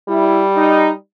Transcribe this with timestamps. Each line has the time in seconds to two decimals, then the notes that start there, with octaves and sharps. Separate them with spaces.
0.09 G3 E4
0.56 D#4